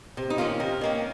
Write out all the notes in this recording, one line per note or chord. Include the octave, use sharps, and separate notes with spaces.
C3
D#4
D#3 A#3 C#4 F4
C3 A#4
D#3 A#3 C#4